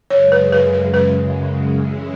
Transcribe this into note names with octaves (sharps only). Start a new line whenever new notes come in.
F#2 C#3 G#3 C#5
B4
B4
B4
B4
E3 G#3 C#4 E4